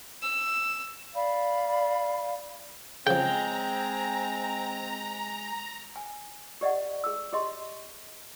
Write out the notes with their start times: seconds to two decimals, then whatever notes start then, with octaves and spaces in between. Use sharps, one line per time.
0.22 E6
1.14 D5 F5 B5
3.07 C#3 F3 G#3 C4 G5 A#5
5.96 G#5
6.61 G4 D5 D#5 F#5
7.04 G#4 E6
7.32 G4 G#4 D#5 C6